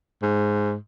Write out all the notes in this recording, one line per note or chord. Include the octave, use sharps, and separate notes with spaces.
G#2